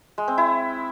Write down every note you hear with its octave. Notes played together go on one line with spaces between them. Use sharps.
G#3
C4
E4